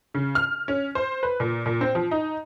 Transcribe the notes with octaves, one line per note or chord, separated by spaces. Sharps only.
C#3
F6
C#4
C5
B4
A#2
A#2
C4
F3
D#4